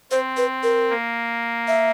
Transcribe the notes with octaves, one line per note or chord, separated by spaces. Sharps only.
C4 C5
B4
A#4
A#3
E5